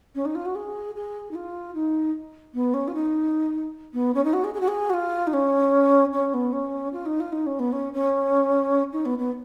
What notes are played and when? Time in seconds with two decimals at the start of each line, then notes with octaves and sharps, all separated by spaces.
0.15 C#4
0.25 D#4
0.35 F4
0.45 F#4
0.55 G#4
0.96 G#4
1.31 D#4
1.35 F4
1.75 D#4
2.54 B3
2.74 C#4
2.88 F4
2.94 D#4
3.93 B3
4.14 C#4
4.24 D#4
4.33 F#4
4.44 G#4
4.54 G#4
4.60 F#4
4.68 G#4
4.90 F#4
4.93 F4
5.27 D#4
5.33 C#4
6.13 C#4
6.34 B3
6.53 C#4
6.93 F4
7.06 D#4
7.20 F4
7.32 D#4
7.46 C#4
7.59 B3
7.72 C#4
7.93 C#4
8.93 D#4
9.05 B3
9.18 B3